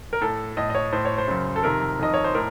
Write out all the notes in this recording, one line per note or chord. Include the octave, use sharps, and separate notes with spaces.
A#4
A2 A4
A2 D#5
D#5
C#5
A2 C5
C#5
C5
F#2 C#3
A4
F2 C3 D#3 A#4
F2 D#3 D#5
C#5
C5
A2 A#4